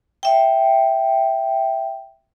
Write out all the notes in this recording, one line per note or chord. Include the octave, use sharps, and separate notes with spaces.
E5 G5